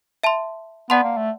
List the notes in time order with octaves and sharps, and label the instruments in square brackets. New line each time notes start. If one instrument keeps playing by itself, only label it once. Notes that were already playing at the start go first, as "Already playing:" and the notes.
[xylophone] E5 A5 C6
[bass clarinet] B3 [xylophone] D5 F#5 A5 C6
[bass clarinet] A#3
A3